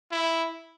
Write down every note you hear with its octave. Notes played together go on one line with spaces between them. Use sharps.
E4